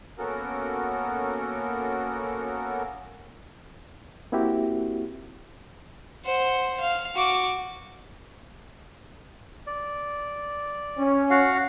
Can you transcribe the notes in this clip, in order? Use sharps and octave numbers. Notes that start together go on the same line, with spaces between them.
A#3 B3 C#4 F#4 A4 A#4
A#3 C4 E4 F#4 G4
C5 F#5
F5
F#4 D6
D5
C#4
F#4 F5 F#5